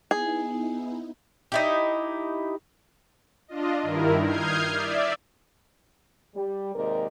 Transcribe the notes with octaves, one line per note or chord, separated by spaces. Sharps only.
B3 D#4 E4 G#4
D#4 E4 G4
D4 F4 D#5
G2 D#3 E4 A#4
D#6 F6 G6 G#6 C7
D5 E5
G3
D#2 C3 G#3 G4 A#4 D5